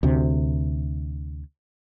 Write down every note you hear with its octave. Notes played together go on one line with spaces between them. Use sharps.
D2 C3